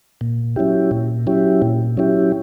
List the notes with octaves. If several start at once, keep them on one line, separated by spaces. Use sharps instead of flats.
A#2
F#3 C#4 E4 G4
A#2
F#3 C#4 E4 G4
A#2
F#3 C#4 E4 G4